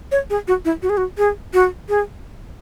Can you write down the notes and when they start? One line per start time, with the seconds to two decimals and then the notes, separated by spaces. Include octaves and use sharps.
0.11 C#5
0.30 G#4
0.47 F#4
0.65 E4
0.82 F#4
0.89 G#4
0.97 F#4
1.18 G#4
1.54 F#4
1.89 G#4